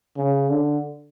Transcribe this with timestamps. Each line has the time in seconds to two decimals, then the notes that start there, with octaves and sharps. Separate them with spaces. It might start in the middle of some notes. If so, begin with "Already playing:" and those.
0.17 C#3
0.50 D3